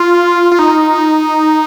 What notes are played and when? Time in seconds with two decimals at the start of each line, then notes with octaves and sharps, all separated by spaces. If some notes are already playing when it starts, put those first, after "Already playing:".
Already playing: F4
0.52 F4
0.59 D#4